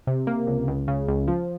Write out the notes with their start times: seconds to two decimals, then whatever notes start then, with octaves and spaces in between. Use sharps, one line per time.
0.07 C3
0.27 A#3
0.47 C#2
0.68 C#2
0.88 C#3
1.08 C#2
1.28 F3